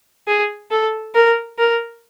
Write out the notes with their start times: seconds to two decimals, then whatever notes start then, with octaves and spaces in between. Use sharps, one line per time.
0.28 G#4
0.71 A4
1.15 A#4
1.59 A#4